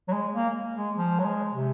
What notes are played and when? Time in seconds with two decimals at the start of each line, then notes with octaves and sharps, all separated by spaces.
0.08 F#3
0.13 G#3
0.34 A#3
0.77 G#3
0.98 F3
1.19 F#3
1.25 G#3
1.53 C3